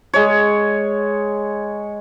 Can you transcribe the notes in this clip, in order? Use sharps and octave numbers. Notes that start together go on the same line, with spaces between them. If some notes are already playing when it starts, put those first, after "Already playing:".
G#3 C#5